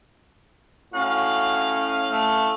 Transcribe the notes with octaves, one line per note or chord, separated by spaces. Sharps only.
A2 C#4 F#4 F5
A3